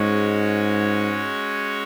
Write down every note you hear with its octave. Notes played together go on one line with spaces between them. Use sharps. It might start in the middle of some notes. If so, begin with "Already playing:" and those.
Already playing: G#2 G#3 C#4 F#4 C#5